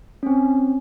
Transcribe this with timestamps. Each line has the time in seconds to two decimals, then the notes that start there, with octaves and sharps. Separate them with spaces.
0.23 C4 C#4